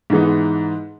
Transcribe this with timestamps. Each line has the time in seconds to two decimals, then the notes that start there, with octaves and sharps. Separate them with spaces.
0.10 G#2 E3 G#3 B3 D#4